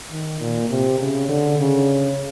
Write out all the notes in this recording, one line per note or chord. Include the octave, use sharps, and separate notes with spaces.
D#3
A#2
C3
C#3
D3
C#3